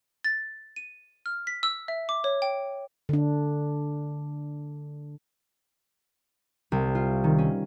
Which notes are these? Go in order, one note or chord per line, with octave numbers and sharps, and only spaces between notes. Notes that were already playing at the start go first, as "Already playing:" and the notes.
A6
D#7
F6
B6
E6
E5
D6
C#5
G5
D3 D4
C2
F4
D#3
C#4